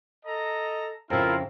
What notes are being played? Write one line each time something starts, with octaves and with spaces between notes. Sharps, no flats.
A4 D#5 A#5
F2 C#3 E4 F4 A#4